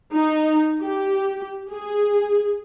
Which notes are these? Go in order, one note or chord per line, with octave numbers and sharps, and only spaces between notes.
D#4
G4
G#4